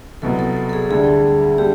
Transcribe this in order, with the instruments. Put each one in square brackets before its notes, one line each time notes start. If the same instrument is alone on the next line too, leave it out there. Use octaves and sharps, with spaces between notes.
[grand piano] C2 B2 F#3 [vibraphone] A4
[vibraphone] A4
A4
A4
G#4
[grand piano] D2 D3 G3 [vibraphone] G#4
[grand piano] D3 G3 [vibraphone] G4